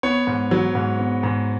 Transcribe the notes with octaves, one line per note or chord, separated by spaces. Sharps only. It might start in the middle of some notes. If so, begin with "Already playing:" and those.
B3 C#5
G#2
F#3
G#2
B3
G#2